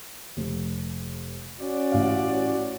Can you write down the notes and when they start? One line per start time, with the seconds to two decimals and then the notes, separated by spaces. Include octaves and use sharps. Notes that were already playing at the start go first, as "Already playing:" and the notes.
0.37 F1
1.61 C#4 F#4 D5
1.92 A1 F5